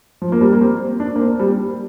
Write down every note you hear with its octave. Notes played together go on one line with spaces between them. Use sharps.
F3
A#3
G3
A#3
C4
D4
A#3
C4
G3